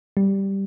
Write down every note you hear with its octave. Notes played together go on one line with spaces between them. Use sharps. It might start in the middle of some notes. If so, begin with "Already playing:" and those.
G3